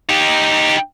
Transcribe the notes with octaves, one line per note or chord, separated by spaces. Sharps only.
D#4 G4